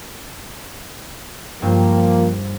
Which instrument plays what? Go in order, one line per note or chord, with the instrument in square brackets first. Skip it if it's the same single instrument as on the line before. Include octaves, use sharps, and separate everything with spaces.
[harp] G2 G3 C5 [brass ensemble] F3 A#3